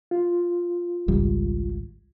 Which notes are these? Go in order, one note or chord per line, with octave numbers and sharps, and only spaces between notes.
F4
G#1 C#2 G3